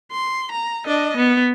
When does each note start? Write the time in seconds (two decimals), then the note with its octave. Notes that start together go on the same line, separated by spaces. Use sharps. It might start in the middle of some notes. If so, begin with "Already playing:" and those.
0.12 C6
0.52 A#5
0.86 D4 D#5
1.17 B3